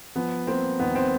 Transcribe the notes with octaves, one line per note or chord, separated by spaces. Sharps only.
F3 B3
A#3 C4
D#2 B3
C4